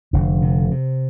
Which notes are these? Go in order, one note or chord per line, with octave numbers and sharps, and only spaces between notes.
F1 D3
C3
C3